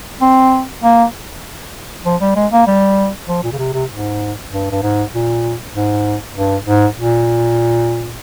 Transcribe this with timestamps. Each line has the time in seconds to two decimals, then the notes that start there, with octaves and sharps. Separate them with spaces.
0.21 C4
0.83 A#3
2.05 F3
2.21 G3
2.36 G#3
2.52 A#3
2.67 G3
3.28 F3
3.43 A#2
3.52 C#3
3.58 C3
3.74 C3
3.90 G#2
4.51 G2
4.71 G2
4.82 G#2
5.13 A#2
5.74 G#2
6.35 G2
6.65 G#2
6.96 A#2